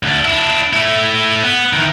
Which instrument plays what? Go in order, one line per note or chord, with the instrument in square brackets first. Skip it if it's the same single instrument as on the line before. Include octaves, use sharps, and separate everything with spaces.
[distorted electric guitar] D2 D4
D4 E4
A3 E4
B3
D#3 E3